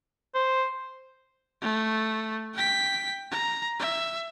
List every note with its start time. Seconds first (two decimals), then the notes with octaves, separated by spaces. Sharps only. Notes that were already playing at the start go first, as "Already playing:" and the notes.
0.35 C5
1.62 A3
2.54 G5 B6
3.32 A#5
3.80 E5